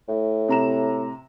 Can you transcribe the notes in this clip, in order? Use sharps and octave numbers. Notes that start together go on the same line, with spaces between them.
A2
C3 A#5 E7